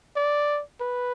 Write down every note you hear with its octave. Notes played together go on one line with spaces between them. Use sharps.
D5
B4